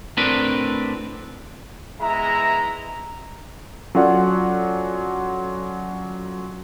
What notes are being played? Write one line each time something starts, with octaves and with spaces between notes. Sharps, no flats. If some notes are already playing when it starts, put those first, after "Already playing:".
A2 C4 D4 A#4 B4
G#3 B3 E4 E5 A#5
F#3 C#4 F4 A4 D5 F#5